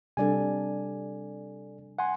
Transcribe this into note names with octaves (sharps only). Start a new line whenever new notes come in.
C3 G3 D4 A4 D5 G#5
F#5 G#5 C6